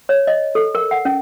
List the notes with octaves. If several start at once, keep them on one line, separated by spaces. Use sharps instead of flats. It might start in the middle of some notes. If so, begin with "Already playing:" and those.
C#5
D#5
A4
A#4
F#5
C#4